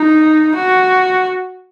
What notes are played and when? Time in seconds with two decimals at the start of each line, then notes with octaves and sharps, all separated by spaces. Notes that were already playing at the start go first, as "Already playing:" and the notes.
Already playing: D#4
0.54 F#4